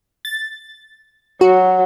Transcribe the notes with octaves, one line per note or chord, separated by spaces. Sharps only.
A6
F#3 F#4